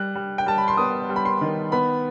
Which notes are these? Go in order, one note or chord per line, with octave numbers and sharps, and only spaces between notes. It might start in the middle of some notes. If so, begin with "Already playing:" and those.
Already playing: G3 F#6
G3
G5
G3 A5
B5
C6
B3 D#6
G3
B5
C6
D#3
B3 B5